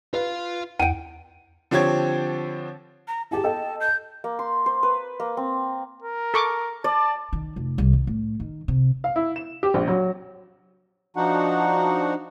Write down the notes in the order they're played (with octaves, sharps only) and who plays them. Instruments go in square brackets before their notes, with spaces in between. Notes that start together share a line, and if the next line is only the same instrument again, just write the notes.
[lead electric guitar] F4 F5 [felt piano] B4
[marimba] E2 [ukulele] F#5 G5 [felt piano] D#7
[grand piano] D3 F3 C4 G4 C#5 G#6
[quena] A#5
[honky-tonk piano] E4 G4 G#4 [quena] A5
[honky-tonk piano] A4 D#5 G5
[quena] G6
[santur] A#3
C6
C5
B4
A#3
C4
[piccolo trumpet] A#4
[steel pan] A4 C#6 D6
[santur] D5 [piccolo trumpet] A5
[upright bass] D#3
F1
C2
D#3
A2
D#3
C3
[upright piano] F5
E4
E7
G4
A#1
F#3
[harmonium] F3 D4 D#4 F#4 F#5